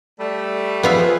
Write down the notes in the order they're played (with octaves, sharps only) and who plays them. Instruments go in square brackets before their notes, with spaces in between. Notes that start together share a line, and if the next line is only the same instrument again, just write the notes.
[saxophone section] G3 A3
[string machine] F3 G#4 B4 [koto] B3 F4 E5